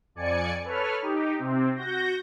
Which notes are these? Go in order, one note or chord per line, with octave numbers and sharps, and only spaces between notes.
F2 D5 G#5 C#7
A4 B4 C#5 F6
D#4 G4
C3 C4
F#4 G6 A#6